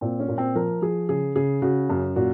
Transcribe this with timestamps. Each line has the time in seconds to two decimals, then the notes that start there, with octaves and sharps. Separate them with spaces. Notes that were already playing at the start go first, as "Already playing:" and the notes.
0.01 A#2 C4
0.20 C#4
0.28 A#2
0.38 C4
0.55 F3 A#4
0.82 F3 G#4
1.09 C#3 G#4
1.36 C#3 G#4
1.62 C#3 F#4
1.90 F#2
2.16 A#2 F#4